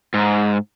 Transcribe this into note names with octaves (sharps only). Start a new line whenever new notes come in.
G#2